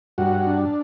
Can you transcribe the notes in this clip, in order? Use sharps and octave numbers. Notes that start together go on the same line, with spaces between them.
G2 F#4
D4